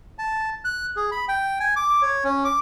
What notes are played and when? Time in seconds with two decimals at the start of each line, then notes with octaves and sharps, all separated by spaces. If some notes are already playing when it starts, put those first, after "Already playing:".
0.18 A5
0.65 F#6
0.96 G#4
1.12 B5
1.29 G5
1.60 G#5
1.76 D6
2.02 C#5
2.24 C#4
2.45 D6